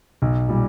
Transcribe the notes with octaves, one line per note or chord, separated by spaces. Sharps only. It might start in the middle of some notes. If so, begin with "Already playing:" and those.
B1
A#2 G3